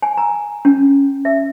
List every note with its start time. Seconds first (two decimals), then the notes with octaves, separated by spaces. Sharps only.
0.02 G#5
0.17 A#5
0.65 C#4
1.25 E5